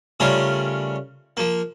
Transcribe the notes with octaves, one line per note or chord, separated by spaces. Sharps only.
C#3 G3 A3 C#4 F4 A#4
F3 A#3